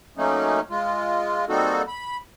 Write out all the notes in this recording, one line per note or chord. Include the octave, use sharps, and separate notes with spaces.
F#3 A3 A#3 C#4 D#4
G#3 F4
G3 A#3 C4 D#4 F#4 A4
B5